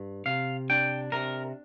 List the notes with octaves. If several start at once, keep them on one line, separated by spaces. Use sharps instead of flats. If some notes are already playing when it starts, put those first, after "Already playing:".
Already playing: G2
C3 F5
D4 G5
C3 A#4